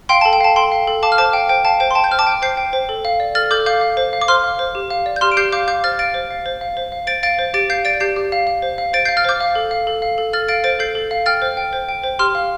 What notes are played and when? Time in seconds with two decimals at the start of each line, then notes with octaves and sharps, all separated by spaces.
0.09 F5 G5 C6
0.21 A4 A5
0.33 G5
0.40 F5 A5
0.56 A4 G5 C6
0.72 F5
0.88 A4
1.03 F5 A5 D6
1.12 F6
1.18 C5 A5 D6
1.33 F5 G5
1.49 C5 G5
1.65 F5 A5
1.80 C5 G5
1.91 C6
1.95 G5 A5
2.04 G6
2.11 C5 F6
2.19 A5 D6
2.27 G5
2.42 C5 G6 C7
2.57 G5
2.73 C5
2.89 A4
3.05 F5
3.20 D5
3.35 A4 F6 A6
3.51 A4 D6 G6
3.66 F5 D6 G6
3.81 F5
3.97 C5
4.13 F5
4.21 D6
4.28 C5 C6 F6
4.44 F5
4.59 C5
4.75 G4
4.90 F5
5.06 D5
5.16 G6
5.21 G4 C6 F6
5.31 D7
5.37 G4 G6 C7
5.53 F5 D6 G6
5.68 F5 D6 G6
5.84 C5 F6 A6
5.99 F5 A6 D7
6.14 C5
6.31 F5
6.46 C5
6.61 F5
6.77 C5
6.92 F5
7.07 C5 A6 D7
7.23 F5 A6 D7
7.39 C5
7.54 G4 A6 D7
7.70 F5 G6 C7
7.85 D5 A6 D7
8.00 G4 G6 C7
8.16 G4
8.32 F5
8.47 F5
8.62 C5
8.78 F5
8.93 C5 A6 D7
9.05 F5 G6 C7
9.17 F6 A6
9.24 C5 D6 G6
9.40 F5
9.55 A4
9.71 F5
9.87 A4
10.02 F5
10.18 A4
10.33 A4 F6 A6
10.48 F5 A6 D7
10.64 C5 A6 D7
10.79 A4 G6 C7
10.95 A4
11.11 F5
11.26 G5 F6 A6
11.42 C5
11.57 G5
11.73 C5
11.89 G5
12.04 C5
12.19 G4 C6 F6
12.35 F5